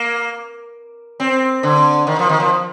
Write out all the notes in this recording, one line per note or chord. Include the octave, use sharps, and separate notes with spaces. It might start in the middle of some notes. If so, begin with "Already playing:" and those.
Already playing: A#3
C4
D3
D#3
F3
D#3
F3